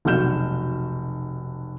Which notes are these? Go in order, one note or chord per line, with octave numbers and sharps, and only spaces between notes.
F1 B1 F#4 F6 G6 E7